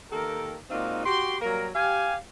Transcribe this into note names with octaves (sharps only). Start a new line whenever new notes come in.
D#3 A#3 G4 A4 A#4
A#2 G#3 C4 D#4 F#4 F5
F#4 G4 C6
F#3 G3 A#3 A#4
G4 F5 G#5